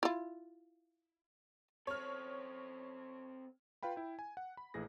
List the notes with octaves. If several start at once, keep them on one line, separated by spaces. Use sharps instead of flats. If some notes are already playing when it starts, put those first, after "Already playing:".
E4 F4
C4 A4 C#5 F6
F4 B4 F5 G5 B5
E4 G5
G#5
F#5
B5
A#1 E3 A3 G#4 A#6